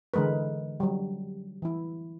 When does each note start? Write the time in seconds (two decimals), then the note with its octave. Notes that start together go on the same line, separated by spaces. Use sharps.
0.14 D3 E3 G#3 A#4 B4
0.80 F#3 G3
1.62 E3 E4